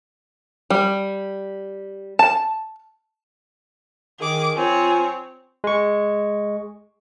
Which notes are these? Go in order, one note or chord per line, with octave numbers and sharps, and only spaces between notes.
G3
A5
D#3 G#4 D6
F3 C4 F4 C#5 G#5
G#3 C#6